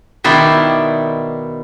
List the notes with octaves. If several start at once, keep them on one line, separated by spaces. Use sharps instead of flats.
B2 D#3 E4 D5 G5 C6